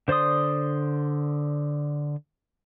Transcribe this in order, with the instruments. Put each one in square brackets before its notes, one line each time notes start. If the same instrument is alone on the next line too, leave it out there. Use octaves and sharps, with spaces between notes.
[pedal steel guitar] D3 C5 D5 C6 D#6